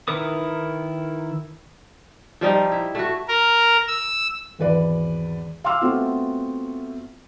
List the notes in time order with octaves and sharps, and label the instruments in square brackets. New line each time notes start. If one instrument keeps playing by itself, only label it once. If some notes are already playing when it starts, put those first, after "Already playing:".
[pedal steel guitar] D#3 E4 A#4 B4 D#6
[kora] F3 G3 D#4
E4
A3 F#4
[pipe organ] A#4
E6
[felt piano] G#1 E2 B4 D5
F5 C6 D6 E6 F6
A3 B3 C4 F4 F#4